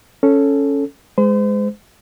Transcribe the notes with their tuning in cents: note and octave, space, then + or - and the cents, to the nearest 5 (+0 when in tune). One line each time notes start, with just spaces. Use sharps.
C#4 +0 A4 +0
G#3 +0 C5 -40